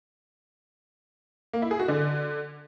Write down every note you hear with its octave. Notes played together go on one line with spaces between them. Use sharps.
A#3
E4
G#4
F#4
D3